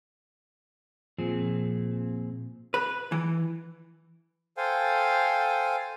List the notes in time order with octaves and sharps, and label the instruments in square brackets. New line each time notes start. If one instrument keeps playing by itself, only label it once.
[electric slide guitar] A#2 C4 G#4 [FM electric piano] F3
[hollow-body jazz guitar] B4
E3
[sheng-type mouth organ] A4 C5 F5 G5 G#5